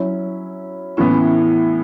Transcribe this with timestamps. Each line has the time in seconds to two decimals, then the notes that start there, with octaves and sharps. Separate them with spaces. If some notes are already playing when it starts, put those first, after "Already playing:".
Already playing: F#3 C#4 E4
0.97 A2 E3 B3 C#4